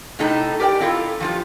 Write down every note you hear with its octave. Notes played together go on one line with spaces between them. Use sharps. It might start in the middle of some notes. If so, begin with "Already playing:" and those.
A2 C3 A3 D#4 A4
G4 A#4 D5 F5 G5
C4 E4 F4 A4
F3 G3 F4